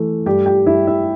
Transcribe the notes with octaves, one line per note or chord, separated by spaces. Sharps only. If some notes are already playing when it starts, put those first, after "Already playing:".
Already playing: E3 A3
G2 G4 G5
G4 G5
G2 E4 E5
E4 E5